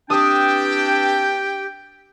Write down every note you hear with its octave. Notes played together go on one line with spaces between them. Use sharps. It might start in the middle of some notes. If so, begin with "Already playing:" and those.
E3 C4 D4 G4 G5 D#6